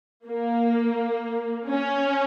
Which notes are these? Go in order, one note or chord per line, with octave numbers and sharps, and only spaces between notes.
A#3
C#4